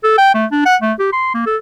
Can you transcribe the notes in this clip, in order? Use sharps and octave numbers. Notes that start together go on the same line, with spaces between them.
A4
G5
A3
D4
F#5
A3
G4
C6
A#3
A4